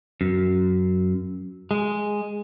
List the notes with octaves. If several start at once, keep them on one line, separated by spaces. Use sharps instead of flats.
F#2
G#3